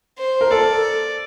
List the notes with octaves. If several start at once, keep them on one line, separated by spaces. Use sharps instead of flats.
C5
A#4
A4 D5